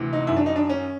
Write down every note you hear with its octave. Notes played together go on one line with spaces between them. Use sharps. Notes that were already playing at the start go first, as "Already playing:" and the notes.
Already playing: D2 C3 E3
D#4
F#2 D#3 E4
D4
D#4
D4
C#4